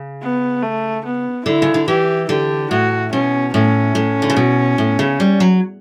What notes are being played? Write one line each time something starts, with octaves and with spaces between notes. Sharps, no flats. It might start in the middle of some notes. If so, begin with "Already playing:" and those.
Already playing: C#3
B3
A3
B3
D3 E4
C#3
D3
E3 G4
D3 G4
A2 F#4
B2 C#4
A2 C#4
A2
D3
C#3
B2
A2
C#3
G3
F#3